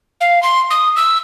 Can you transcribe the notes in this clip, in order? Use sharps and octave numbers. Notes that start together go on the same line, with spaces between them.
F5
C6
D#6
E6